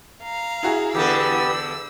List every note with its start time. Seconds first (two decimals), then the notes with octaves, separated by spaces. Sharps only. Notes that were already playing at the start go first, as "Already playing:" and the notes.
0.22 F5 A#5
0.63 E4 F#4 G#4
0.95 E2 D3 B3 G4 A4 E6